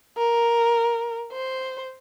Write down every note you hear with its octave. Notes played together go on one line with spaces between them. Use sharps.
A#4
C5